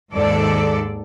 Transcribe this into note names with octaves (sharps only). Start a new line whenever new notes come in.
D#2 G#2 A4 D5